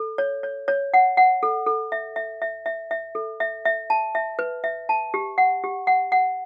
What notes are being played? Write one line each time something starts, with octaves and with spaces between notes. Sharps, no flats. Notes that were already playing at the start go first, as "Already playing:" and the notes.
Already playing: A4
C#5
C#5
C#5
F#5
F#5
A4
A4
E5
E5
E5
E5
E5
A4
E5
E5
A5
E5
B4
E5
A5
G4
F#5
G4
F#5
F#5